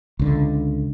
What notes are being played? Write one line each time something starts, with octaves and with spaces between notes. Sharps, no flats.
C#2 D3